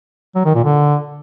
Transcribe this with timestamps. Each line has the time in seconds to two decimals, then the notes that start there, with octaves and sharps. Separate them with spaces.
0.35 F#3
0.45 D#3
0.55 A#2
0.64 D3